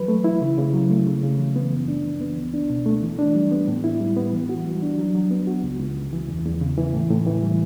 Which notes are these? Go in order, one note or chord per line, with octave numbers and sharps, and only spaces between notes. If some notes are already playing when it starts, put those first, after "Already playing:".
Already playing: E3 F#3 B4
A3
E4
C#3
C#3
F#3
A3
C#3
C#3
E3
B3
F#2
D4
E3
B3
C#2
D4
B2
A3
E3
D4
G3
B3
A2
E4
G3
B3
E3
F#4
G3
D4
F#3
F#3
B3
F#4
C#2
C#2
C#3
E3
E2
E2
C#3
E3
A2
A2
E3
G3